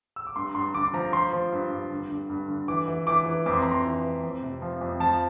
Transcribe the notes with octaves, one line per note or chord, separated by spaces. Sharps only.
E6
D6
G2 C6
G2 C6
D3 D6
F3 A#5
F3 C6
F3
G2
G2
D3
G2
G2
D3
E3 D6
E3
E3 D6
E3
F2 D6
C6
F2 A#5
C6
E3
E3
F2
C3
F3
F2
F3 A5